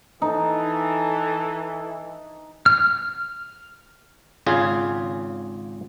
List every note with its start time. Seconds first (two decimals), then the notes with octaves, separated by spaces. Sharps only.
0.22 E3 D#4 A4
2.66 F6
4.46 G#1 C#3 F4 G#4